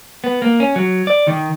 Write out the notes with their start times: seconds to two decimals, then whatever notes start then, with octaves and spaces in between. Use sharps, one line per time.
0.24 B3
0.42 A#3
0.60 C#4
0.76 F#3
1.07 D5
1.27 D#3